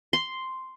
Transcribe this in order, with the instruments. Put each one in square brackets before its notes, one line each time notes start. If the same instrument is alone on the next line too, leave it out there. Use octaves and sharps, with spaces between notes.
[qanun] C6